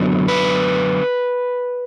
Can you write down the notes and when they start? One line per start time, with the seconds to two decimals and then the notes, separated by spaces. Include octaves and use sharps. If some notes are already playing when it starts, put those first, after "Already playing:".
Already playing: F#2 D3 F#3 B3
0.28 B4